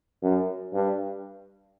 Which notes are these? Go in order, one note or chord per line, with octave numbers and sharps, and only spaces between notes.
F#2
G2